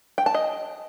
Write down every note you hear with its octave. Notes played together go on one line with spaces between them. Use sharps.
G5
A5
D#5